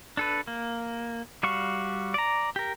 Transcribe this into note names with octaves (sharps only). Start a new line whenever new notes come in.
D4 A4 B4
A#3
G3 F#4 F5 C#6
D5 A#5
G4 A#4